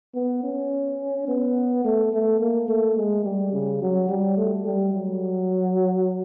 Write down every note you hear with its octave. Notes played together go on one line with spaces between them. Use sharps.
B3
C#4
B3
A3
A3
A#3
A3
G#3
G3
C#3
F#3
G3
A3
G3
F#3